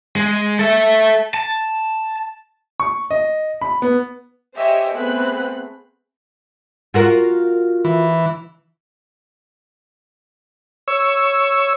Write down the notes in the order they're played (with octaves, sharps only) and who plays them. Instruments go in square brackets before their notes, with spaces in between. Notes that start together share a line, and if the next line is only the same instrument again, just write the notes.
[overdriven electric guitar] G#3
A4 E5
A5
[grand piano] C#6
D#5
B5
B3
[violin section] G4 C5 C#5 D#5 E5 G#5
A3 B3 C4 G#4 B5 F#6
[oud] F4 F#4 A#4
[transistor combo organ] E3
C#5 E6